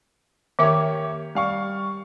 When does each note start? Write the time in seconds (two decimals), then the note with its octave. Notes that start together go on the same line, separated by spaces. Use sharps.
0.59 D#3 A#3 G4 C#5 E5 D6
1.35 G3 F5 C#6